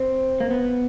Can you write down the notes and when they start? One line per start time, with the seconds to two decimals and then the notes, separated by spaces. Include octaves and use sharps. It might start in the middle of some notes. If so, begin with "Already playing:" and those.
Already playing: C4
0.40 A#3
0.51 B3